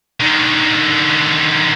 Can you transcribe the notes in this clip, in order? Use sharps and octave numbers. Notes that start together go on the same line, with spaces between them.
D3 D#3